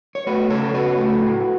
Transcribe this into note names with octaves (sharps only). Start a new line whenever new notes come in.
C#5
A3 F#4 B4
C#3 A4 C#5
A4
C#3 F#4 B4
A3
A2